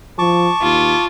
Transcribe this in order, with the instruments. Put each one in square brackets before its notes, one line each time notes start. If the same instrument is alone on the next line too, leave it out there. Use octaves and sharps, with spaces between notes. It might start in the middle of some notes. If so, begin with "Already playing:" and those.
[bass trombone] F3 [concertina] A5 C#6 D6
[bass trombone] D#2 [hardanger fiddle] F4